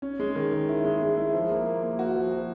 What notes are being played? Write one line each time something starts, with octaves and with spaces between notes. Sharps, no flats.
C#4
G#3
D#3
D#3
E4
G#3
G#3
E4
F3
A#3
A#3
A#3
F#4
F3
F#4